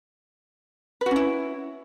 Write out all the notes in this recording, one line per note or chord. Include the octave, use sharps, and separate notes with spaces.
C#4 E4 F#4 B4